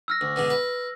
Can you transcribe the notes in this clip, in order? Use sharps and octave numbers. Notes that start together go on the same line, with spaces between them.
E6 F6 A#6
D2
B2 D3 G#3
B4